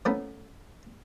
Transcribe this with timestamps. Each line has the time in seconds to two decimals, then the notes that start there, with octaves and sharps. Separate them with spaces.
0.05 F3 A3 B3 C#4 D#4 E4